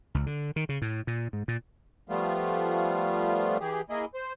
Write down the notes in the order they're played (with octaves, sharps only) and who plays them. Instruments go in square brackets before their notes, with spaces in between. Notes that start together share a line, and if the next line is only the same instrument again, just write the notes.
[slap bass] C#2
D3
D#3
C#3
A2
A#2
G#2
A#2
[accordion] F3 G3 A3 B3 F4
E3 G4 G#4
A#3 E4 G#4 D#5
C5